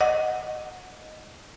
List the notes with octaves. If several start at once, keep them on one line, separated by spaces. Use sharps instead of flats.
D#5 F#5